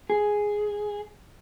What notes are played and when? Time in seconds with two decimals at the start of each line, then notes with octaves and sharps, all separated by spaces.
0.10 G#4